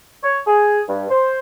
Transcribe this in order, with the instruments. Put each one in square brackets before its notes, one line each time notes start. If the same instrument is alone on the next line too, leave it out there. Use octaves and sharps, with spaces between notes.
[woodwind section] C#5
G#4
G2
C5